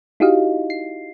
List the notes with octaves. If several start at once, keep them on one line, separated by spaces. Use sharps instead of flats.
D#4 E4 F#4 G4 D#5 F5
C7